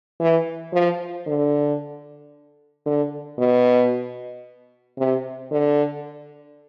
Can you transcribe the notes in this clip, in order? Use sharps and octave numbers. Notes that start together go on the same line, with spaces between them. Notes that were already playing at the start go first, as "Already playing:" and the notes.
E3
F3
D3
D3
B2
C3
D3